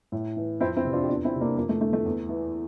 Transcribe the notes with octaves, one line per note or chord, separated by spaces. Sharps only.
A2
E3
F2 C4 E4
C4 E4
C3 E3
D4 F4
G4
E2 D4 F4
C4 E4
C3 E3
A#3 D4
F2 A#3
A3
D3 A3
A3
E2
E3